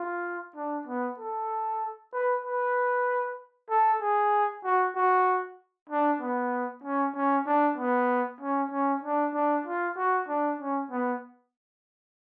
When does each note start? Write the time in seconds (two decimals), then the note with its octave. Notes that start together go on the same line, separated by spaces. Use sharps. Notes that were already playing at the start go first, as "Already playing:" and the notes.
Already playing: F4
0.56 D4
0.87 B3
1.19 A4
2.13 B4
2.45 B4
3.70 A4
4.01 G#4
4.64 F#4
4.95 F#4
5.90 D4
6.21 B3
6.83 C#4
7.15 C#4
7.46 D4
7.77 B3
8.40 C#4
8.71 C#4
9.03 D4
9.34 D4
9.66 F4
9.97 F#4
10.28 D4
10.60 C#4
10.91 B3